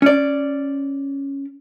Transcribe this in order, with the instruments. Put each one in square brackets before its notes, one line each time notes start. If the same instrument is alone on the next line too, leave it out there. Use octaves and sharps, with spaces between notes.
[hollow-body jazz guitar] C#4 D5